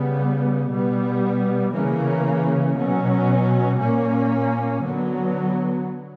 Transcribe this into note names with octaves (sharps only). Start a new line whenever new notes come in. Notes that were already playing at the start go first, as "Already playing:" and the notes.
Already playing: C#3 G3 B3
B2 G3 B3
C#3 E3 A#3 C#4
B2 F#3 C#4
A#2 A#3 C#4
D3 F#3 B3